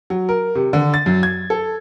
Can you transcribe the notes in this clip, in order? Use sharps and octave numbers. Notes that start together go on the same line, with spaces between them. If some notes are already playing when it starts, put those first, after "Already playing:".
F#3
A#4
C3
D3
A6
F#2
G#6
A4